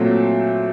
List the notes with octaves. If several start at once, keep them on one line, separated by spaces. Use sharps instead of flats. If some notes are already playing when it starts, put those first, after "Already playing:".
Already playing: A#2 F#3 A3 C4